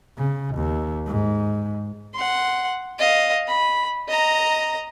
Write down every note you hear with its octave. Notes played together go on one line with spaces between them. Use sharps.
C#3
D#2
G#2
F#5 C6
D#5 F5
B5
D#5 A#5